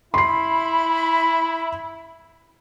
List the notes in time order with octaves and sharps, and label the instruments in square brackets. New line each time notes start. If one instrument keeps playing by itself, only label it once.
[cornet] E4 [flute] B5 [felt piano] C6 C7